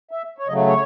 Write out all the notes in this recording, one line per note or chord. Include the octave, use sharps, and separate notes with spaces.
E5
C#5
C#3 F#3 A3 D#5
C#5